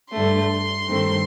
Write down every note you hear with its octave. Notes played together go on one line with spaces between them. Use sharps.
G2 D3 A3 C6
G2 D#3 A3 C4